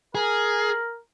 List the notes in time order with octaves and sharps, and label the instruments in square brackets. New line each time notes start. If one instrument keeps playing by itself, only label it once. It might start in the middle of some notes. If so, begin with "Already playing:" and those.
[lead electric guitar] G#4 [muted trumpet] A#4